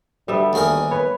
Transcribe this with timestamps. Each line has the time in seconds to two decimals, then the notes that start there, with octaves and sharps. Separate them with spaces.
0.28 D2 G3 B3 E5
0.53 D#2 G#4 A#4
0.91 B4 C#5